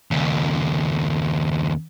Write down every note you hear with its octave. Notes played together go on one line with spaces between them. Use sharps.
D#2 C#3